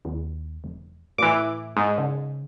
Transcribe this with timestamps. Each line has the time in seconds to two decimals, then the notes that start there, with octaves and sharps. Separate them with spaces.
0.05 D#2
0.64 E1
1.18 A2 E3 D6
1.77 G#2
1.98 C#3